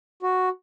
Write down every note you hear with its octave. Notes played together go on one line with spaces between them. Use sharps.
F#4